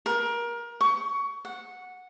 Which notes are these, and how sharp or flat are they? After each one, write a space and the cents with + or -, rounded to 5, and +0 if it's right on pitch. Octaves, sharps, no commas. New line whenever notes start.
A#4 +25
C#6 +20
F#5 -10